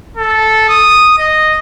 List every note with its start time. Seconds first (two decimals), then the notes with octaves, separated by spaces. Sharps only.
0.17 A4
0.69 D#6
1.18 D#5